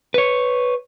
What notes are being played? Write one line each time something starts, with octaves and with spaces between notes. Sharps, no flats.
B4 C#5